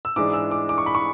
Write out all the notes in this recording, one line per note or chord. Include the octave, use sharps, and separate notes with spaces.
E6
G#2 E3 G#3 D4 D6
E6
D6
D6
C#6
B5
C#6